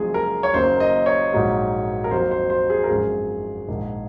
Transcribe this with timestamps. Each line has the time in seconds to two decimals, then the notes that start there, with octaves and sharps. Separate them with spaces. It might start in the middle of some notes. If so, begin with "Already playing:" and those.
Already playing: F#1 F#2 F3 G#3 G#4
0.14 A#4
0.43 C#5
0.54 F#1 F#2 D#3 A#3 C5
0.80 D#5
1.06 C#5
1.33 A#1 G#2 F#3 A#3
2.04 A#4
2.11 F2 D#3 F#3 A#3 C5
2.31 C5
2.50 C5
2.70 G#4
2.84 A#4
2.89 G#1 F#2 F3 G#4
3.68 A#1 G#2 D#3 A#3